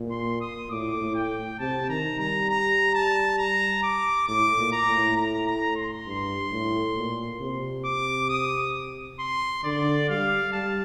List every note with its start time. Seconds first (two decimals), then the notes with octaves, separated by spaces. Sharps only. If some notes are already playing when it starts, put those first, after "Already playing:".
Already playing: A#2
0.11 C6
0.41 D#6
0.70 A2 D6
1.01 A2
1.15 G5
1.59 C3 A5
1.89 D#3 A#5
2.19 G3 A#5
2.49 A#5
2.94 A5
3.38 A#5
3.83 D6
4.28 A2 D6
4.58 A#2
4.72 A#5
4.87 A2
5.16 A#5
5.47 A#5
5.76 C6
6.06 G2
6.51 A2
6.96 A#2
7.41 C3
7.85 D6
8.29 D#6
9.20 C6
9.64 D3 D5
10.09 G3 F5
10.53 G3 A5